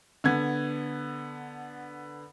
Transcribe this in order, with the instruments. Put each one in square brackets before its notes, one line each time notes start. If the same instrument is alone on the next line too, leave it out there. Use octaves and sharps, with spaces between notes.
[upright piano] D3 B3 G#6